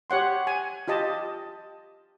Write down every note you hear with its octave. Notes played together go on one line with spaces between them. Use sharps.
G4 C#5 F#5 C6
G#5
F4 G4 D#5 A5